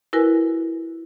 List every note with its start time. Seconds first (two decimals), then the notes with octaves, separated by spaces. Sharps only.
0.13 E4 F#4 A#4 B4 G#5